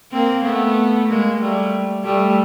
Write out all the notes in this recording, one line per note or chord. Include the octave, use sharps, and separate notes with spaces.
A#3 C4
A3 B3
G#3 A#3
G3 A3
G3 A3